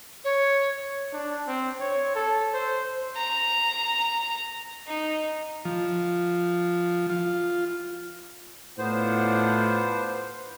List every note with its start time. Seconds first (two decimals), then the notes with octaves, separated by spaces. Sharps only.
0.24 C#5
1.13 D4
1.48 C4
1.80 C#5
2.15 A4
2.54 C5
3.16 A#5
4.87 D#4
5.65 F3
7.10 F4
8.78 A2 B3 D4 F4 C5 F#5